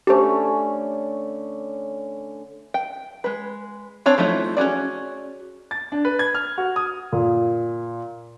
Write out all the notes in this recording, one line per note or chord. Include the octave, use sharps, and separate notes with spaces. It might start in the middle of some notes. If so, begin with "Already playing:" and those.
D3 A3 C#4 G4 C5
G5
G#3 B4
C4 D4 C#5 G#5
F3 F#3 A3 D#4 E4
C#4 F#4 G#4 D5
A6
D4
B4
G#6
F6
F#4
D#6
A#2